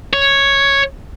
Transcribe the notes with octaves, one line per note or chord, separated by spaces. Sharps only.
C#5